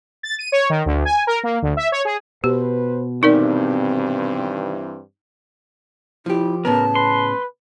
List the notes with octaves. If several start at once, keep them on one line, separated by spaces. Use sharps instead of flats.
A6
D#7
C#5
D#3
D2
G#5
A#4
A#3
D2
E5
C#5
G#4
B2 G4 B4 C5
G2 C3 D#3 E3 C4 D#4 A#4 D5
F3 E4 G4
A2 C#3 B3 A#4 A5
B4 C6